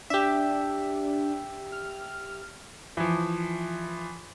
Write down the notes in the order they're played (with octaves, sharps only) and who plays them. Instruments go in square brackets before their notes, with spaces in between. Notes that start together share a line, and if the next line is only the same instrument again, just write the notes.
[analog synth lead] D4 [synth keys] G4 E5
[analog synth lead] F6
[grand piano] E3 F3